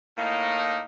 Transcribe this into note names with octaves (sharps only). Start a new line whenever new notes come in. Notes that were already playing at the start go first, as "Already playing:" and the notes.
A2 A#3 D#4